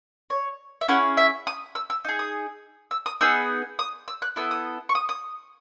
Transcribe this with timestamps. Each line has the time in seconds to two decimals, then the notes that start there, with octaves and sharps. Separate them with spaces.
0.30 C#5
0.81 E5
0.88 C#4 E4 G#4 F#5
1.17 E5
1.47 D#6
1.75 E6
1.90 E6
2.05 D#4 G#4
2.19 D#6
2.91 E6
3.06 D#6
3.21 B3 D#4 G#4 E6
3.79 D#6
4.08 E6
4.22 F#6
4.36 B3 E4 A4 E6
4.51 D#6
4.89 C#6
4.95 D#6
5.09 D#6